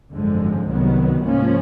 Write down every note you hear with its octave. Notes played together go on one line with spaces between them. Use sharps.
G#1 F#2 D3 F3 G#3
C2 C3 D#3 F#3 B3
G#2 F3 A#3 C#4